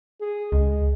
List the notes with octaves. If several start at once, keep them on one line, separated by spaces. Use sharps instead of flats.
G#4
C#2 G#3